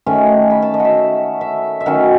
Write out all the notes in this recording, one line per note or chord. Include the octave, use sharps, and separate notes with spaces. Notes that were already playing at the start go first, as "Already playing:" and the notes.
D#3 A3 C#4 G#5
B5
A5
D#5
E5 F#5
E5
E5
D#3 F#3 C#4 F#5